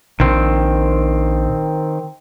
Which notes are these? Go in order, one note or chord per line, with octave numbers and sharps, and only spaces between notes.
A#1 D#3 C4